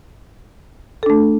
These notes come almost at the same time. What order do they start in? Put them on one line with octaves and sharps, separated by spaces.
A4 D4 A3